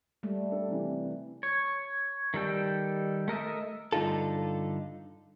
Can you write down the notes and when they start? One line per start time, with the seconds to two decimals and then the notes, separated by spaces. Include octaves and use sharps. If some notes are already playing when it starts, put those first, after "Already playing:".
0.23 G3 A3
0.51 D4 A4
0.68 C3 E3
1.43 C#5
2.34 D#3 G3 A4 G5
3.28 A3 A#4 D#5 E5
3.93 G2 D3 D#4 F4 A4